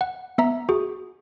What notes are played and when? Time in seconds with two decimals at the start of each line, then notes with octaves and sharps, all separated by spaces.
0.01 F#5
0.38 B3 E5 A#5
0.69 F#4 G#4